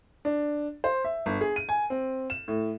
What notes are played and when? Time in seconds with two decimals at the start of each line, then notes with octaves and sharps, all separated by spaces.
0.25 D4
0.84 C5
1.05 E5
1.26 G1
1.41 G#4
1.56 D#7
1.69 G#5
1.90 C4
2.30 E7
2.48 A2